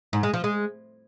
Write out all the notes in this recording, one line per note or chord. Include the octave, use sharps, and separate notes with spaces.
G#2
G#3
F3
G#3